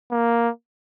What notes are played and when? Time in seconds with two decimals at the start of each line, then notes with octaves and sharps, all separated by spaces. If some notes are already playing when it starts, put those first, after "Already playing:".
0.11 A#3